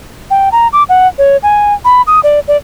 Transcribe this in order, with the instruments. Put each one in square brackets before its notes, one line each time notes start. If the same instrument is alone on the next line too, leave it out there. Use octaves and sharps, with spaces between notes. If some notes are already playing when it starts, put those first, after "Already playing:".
[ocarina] G5
A#5
D6
F#5
C#5
G#5
B5
D#6
D5
D5